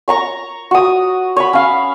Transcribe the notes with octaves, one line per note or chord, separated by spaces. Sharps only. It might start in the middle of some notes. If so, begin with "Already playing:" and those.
C#5 A#5 C#6
F#4 D#6
C#5 B5
C#4 F5